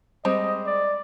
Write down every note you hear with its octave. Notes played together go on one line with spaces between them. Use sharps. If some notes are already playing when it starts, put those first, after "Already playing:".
G3 G#3 C4 D#5
D5